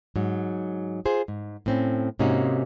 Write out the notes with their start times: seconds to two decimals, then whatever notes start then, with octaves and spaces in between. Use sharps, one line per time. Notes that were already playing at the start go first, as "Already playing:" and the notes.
0.16 G#2 F#3
1.06 F4 G#4 C5
1.28 G#2
1.66 A2 C4 C#4
2.19 G#2 C3 A#3 C#4 D#4 F#4